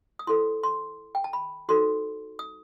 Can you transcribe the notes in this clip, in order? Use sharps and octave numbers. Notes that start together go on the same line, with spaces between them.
D#6
E4 A4 C5 C6
C6
G5
A5
B5
D#4 F#4 A4 C5 C6
D#6